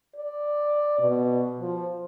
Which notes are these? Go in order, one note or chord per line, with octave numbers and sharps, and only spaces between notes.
D5
B2
F3